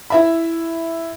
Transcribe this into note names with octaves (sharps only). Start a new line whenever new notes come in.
E4 E5 B5